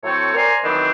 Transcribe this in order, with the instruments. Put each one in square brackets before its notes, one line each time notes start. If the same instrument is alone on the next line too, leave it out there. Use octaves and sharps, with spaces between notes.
[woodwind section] A2 F#3 A3 C4 A4 C#5
A#4 C5 D5 G#5 A#5 C6
D#3 E3 F#3 B3 C4 D4